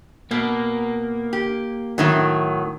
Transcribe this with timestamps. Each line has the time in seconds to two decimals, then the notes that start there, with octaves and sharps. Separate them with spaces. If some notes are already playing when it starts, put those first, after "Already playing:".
0.31 B2 A#3
1.33 G4
1.98 A2 D#3 F#3